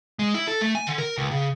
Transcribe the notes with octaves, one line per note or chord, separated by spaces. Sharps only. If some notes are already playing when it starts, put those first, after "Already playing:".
G#3
E4
A4
A3
G#5
D3
A#4
C#2
C#3